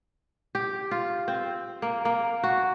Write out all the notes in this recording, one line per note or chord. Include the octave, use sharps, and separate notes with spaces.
G4
F4
C4
A#3
A#3
F#4